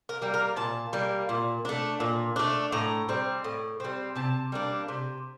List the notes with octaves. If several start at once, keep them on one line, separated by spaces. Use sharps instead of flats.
A#4
G3 A#3
A#4
A#2 A5
G3 A#3
A#2
A3 D4
A#2
A3 D4
A2 A#5
G3 C4
A2
G3 C4
C3 A5
G3 A#3 D4
C3